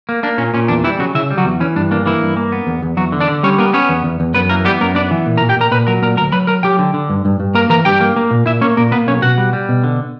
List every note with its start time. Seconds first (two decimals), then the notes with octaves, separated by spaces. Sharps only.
0.09 A#3
0.23 A#3 D4
0.38 A#2 C#4
0.54 A#2 C#4
0.68 E2 D4
0.84 E3 G3 E4
0.99 C#3 F#3 F#4
1.15 C#3 E4 E5
1.31 G3
1.37 F#3 F#4
1.45 E2
1.60 E3 C#4
1.76 G2 D4
1.91 A#3 D4
2.06 E3 A#3 E4
2.22 G2
2.37 A#3
2.52 B3
2.67 E2
2.83 E2
2.97 E2 F#3 F#4
3.12 D3
3.20 D4 D5
3.28 D3
3.43 G3 C#4 C#5
3.58 A#3 B3 A#4
3.73 B3 C#4 C#5
3.89 E2
4.04 E2
4.20 E2
4.35 F#2 B3 B4
4.49 E3 A#3 A#4
4.65 G3 B3 G4
4.80 F#2 A#3 A#4
4.95 B3 D4 D5
5.11 E3
5.26 A#2
5.37 A#4 A#5
5.41 A#2
5.49 G4 G5
5.57 A#2 A#4 A#5
5.71 A#2 B4 B5
5.87 F#3 A#4 A#5
6.02 A#2 A#4 A#5
6.17 D2 A#4 A#5
6.32 F#3 B4 B5
6.47 F#3 A#4 A#5
6.63 F#3 G4 G5
6.79 D3
6.94 D3
7.10 G2
7.25 G2
7.40 G2
7.55 A#3 A#4 A#5
7.70 E3 A#4 A#5
7.85 G2 G4 G5
8.01 A#3
8.16 A#3
8.31 A#2
8.46 A#2 E4 E5
8.61 A#3 C#4 C#5
8.77 A#2 A#3 A#4
8.91 A#3 B3 B4
9.07 B1 C#4 C#5
9.22 B2 F#4 F#5
9.38 G3
9.53 G3
9.69 B2
9.84 D3